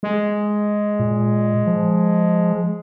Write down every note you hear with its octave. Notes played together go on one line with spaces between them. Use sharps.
G#3
A#2
F3